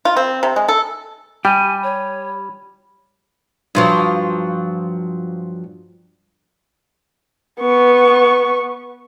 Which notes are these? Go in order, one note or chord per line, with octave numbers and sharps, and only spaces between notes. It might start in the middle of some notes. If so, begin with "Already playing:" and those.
F4
C4
C3
G#3
A4
G3 G4 G#5 B5
C#5
G2 F3 F#3
B3 C#6